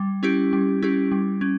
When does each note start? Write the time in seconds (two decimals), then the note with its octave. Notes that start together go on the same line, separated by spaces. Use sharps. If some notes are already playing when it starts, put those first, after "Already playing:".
Already playing: G3
0.23 C#4 E4 G4
0.53 G3
0.82 C#4 E4 G4
1.12 G3
1.41 C#4